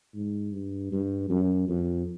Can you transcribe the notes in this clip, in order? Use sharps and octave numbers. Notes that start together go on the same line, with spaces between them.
G#2
G2
G2
F#2
F2